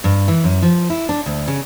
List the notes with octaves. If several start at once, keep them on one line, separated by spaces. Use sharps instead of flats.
G2
E3
F#2
F3
E4
D4
D2
C#3